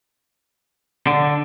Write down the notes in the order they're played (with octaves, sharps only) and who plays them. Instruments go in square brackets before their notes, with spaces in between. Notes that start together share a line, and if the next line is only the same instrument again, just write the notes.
[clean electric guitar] D3